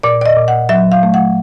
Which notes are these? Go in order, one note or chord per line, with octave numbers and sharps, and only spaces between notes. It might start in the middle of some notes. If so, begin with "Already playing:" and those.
A#2 D5
D5
D#5
A#2
F#5
F#3 E5
F5
A3
F#5